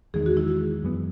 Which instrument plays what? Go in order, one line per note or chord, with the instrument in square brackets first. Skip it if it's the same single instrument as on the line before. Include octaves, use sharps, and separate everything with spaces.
[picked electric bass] E2 D#3 G#3 [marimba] G#4
[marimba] F#4
E4
F#4
[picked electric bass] F#2 E3 B3